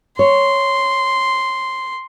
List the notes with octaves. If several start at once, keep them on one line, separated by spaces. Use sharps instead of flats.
C#5 C6